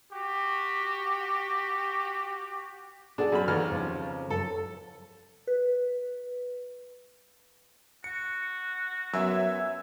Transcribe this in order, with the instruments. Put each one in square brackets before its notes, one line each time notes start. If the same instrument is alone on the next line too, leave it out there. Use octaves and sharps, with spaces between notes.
[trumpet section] F#4 G4
[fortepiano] D4 [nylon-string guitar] G#4 A4 F#5
[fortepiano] F#2 B5
[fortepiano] D#2 F6 [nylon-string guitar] E3
[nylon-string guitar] F2 C#3 F3
[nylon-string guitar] F#2 [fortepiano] A4
[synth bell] B4
[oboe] F#4 [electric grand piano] C#7
[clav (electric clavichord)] F#2 [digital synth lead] F#3 [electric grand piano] B3 E5 E6 [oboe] G#5